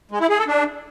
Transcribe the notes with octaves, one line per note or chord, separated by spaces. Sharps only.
G#3
E4
G#4
A4
D4